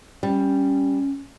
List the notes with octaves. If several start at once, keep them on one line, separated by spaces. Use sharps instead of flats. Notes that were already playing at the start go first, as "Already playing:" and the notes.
G3 C#4